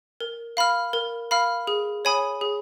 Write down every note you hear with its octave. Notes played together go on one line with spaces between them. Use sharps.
A#4
F5 B5 F6
A#4
F5 B5 F6
G#4
C#5 G#5 B5 D#6
G#4